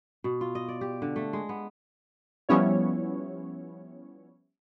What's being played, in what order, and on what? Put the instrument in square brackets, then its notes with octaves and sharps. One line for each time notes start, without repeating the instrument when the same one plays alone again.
[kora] B2
F4
D#5
D5
G4
D3
A3
G#3
B3
[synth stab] F3 G3 B3 C#4 E4 C#5